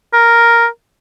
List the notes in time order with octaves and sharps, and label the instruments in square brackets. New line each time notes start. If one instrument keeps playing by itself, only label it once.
[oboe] A#4